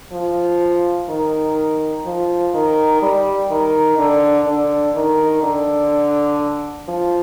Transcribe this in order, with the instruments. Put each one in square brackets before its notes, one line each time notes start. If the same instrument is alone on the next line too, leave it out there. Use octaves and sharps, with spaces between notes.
[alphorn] F3
D#3
F3
D#3
G3
D#3
D3
D3
D#3
D3
F3